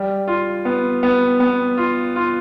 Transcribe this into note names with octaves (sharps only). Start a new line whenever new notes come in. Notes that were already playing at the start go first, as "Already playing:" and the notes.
Already playing: G3
F4
B3
B3
B3
F4
F4